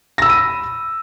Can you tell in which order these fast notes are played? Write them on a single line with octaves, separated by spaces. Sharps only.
A#6 E6 B5 D#7